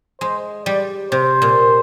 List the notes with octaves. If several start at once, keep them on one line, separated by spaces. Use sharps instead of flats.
G#3 C5
G3 D5
C3 C5
A#2